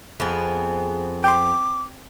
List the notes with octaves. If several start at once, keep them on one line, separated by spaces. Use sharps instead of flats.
F2 B3 C4 G#4
G5 C6 D6